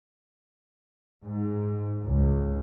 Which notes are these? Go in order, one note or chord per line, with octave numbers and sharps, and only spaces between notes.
G#2
C#2